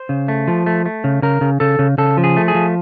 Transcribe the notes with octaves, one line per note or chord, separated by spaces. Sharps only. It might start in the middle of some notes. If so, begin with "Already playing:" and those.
Already playing: C5
C#3
A3
F3
A3
A3
C#3
C#3 A#4
C#3
C#3 A4
C#3
C#3 A4
F3
G#4
A3
G#4
F3